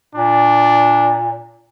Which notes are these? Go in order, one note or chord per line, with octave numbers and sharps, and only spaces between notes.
A#2 D4